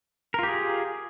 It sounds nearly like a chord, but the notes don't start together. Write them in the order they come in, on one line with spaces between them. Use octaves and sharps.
A#4 F4 G4 G#4